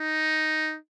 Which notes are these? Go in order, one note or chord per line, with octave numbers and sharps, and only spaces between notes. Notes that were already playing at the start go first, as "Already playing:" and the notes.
Already playing: D#4